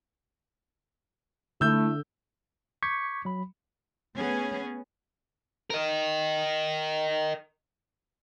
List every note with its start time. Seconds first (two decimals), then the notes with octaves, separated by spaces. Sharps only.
1.61 D3 A3 E4 E6 G6
2.83 C#6 D6 G6 G#6 B6 C#7
3.25 F#3 B5
4.17 A3 B3 C#4 G#4
5.70 A#4 D#5